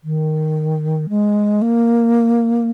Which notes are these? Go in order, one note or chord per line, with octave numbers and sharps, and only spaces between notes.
D#3
G#3
A#3